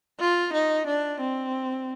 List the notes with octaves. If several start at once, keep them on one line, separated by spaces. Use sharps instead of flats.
F4
D#4
D4
C4